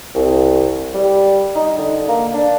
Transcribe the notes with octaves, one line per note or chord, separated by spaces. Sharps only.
C2
G3
D#4
D3
A#3
D4